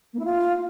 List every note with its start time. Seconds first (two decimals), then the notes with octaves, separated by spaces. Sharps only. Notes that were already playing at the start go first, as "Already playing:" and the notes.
0.13 A#3
0.19 E4
0.24 F4